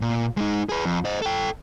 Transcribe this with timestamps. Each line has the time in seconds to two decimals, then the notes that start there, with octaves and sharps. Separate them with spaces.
0.01 A#2
0.37 G#3 D#4
0.69 G#4 B4
0.85 F2
1.05 C5 D#5
1.22 A4 G5